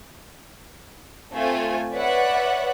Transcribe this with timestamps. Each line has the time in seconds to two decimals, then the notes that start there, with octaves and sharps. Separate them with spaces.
1.33 A3 C4 F4 A4 G#5
1.94 B4 C#5 D5 E5 F#5